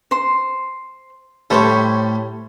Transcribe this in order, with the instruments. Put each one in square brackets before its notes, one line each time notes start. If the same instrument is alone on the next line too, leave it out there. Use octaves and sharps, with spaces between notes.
[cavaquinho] C5 C6
[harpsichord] A2 G3 [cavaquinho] A4 C5 C#5